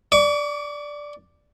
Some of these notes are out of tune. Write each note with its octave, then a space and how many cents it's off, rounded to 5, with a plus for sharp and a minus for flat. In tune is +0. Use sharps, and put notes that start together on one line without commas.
D5 +0 C#6 +40